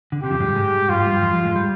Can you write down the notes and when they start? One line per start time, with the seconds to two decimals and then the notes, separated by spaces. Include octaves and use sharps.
0.12 D3
0.22 C3 G4
0.31 F2 F3
0.40 G#2 G#3
0.47 G2 G3
0.56 G#2 G#3
0.89 G2 G3 F4
1.01 F3
1.07 G2 G3
1.22 F2 F3
1.34 F2 F3
1.45 G#2 G#3
1.56 G3